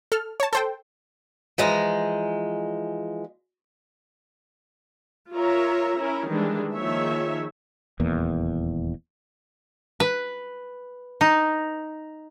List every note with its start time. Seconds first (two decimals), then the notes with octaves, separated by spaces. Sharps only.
0.12 A4 F6
0.40 C#5 A5
0.53 A4 C5 G5
1.58 E3 F3 G#3 A#5
5.34 F4 A#4 C#5 E5 A#5
5.97 C#4 E4 A#4
6.28 D#3 E3 G3 G#3 D4
6.74 D#3 F3 A#3 G#4 C#5 E5
8.00 D#1 E2 A#3
10.00 B4
11.21 D#4